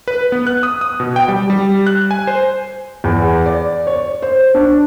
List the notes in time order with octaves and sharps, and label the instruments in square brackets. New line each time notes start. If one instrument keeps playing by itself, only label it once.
[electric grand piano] B4
B3
F#6
D#6
D#6
B2
G5
G3
G3
F#6
G#5
C5
[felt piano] E2
D5
C#5
C5
D4